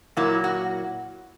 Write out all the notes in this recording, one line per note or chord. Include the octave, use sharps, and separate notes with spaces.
A#2 F#3 A#3 E4
F#4